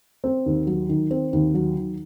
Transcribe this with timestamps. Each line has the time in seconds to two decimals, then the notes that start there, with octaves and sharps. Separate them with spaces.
0.24 C4
0.46 D#2
0.67 F#3
0.89 D#3
1.11 C4
1.33 D#2
1.54 F#3
1.76 D#3